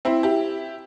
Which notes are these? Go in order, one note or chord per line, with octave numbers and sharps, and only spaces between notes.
C4 E4
E4 G4